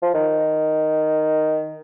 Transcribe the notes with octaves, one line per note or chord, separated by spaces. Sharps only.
F3
D#3